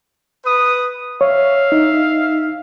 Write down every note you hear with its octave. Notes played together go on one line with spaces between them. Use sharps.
B4 D#6
C#5 E5 F5
D#4